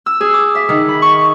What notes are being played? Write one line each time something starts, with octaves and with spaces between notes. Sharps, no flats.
E6
G#4
D6
E5
D#3
B5
C#6